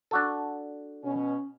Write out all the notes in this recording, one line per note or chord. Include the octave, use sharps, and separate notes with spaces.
D4 F#4 A4
B2 C#4